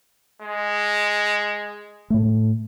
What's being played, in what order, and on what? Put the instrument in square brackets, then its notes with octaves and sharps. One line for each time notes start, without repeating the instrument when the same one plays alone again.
[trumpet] G#3
[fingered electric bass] A2 A3